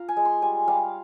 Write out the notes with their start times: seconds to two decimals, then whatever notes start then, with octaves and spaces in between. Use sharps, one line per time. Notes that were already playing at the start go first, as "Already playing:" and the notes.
Already playing: F4 F5 A#5
0.09 G#5
0.17 G#3
0.25 C6
0.42 G3 G#5
0.68 G3 F5